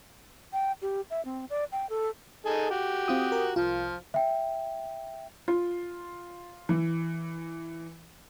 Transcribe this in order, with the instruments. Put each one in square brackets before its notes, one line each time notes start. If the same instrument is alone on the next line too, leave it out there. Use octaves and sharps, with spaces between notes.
[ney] G5
G4
E5
C4
D5
G5
A4
[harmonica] D#4 G#4 A4
F#4 G4
[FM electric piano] C4 F4 D#6
A#4
[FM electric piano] C2 F4 [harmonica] F3
[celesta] E5 G5
[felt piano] F4
E3